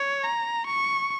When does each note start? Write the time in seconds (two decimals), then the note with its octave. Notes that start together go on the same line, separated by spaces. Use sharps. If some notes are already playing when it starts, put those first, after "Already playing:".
Already playing: C#5
0.24 A#5
0.68 C#6